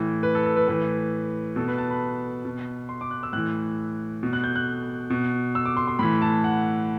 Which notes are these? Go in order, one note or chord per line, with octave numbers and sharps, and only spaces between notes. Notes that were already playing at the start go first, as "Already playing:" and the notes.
Already playing: A2 E3
B4
A4
A4
B4
A2 E3 B4
B2 A4
B4
A5
B5
B2
C6
D6
F#6
E6
A2 E3 F#6
B2
F#6
G6
F#6
B2
E6
D6
C6
C6
A2 E3 B5
A5
F#5